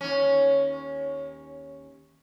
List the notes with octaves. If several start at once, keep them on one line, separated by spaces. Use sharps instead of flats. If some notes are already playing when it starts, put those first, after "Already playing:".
D#2 C#4